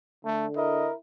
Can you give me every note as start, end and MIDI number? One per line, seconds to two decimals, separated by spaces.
0.25 0.87 50
0.25 0.47 57
0.56 0.95 64
0.56 0.94 70
0.56 0.89 75